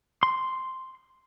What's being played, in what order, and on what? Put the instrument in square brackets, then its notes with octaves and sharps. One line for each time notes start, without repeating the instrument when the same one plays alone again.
[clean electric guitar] C6